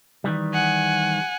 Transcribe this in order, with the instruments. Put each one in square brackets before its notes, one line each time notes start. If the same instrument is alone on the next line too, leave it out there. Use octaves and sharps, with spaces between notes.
[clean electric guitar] D#3 E3 G3
[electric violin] F#5 G#5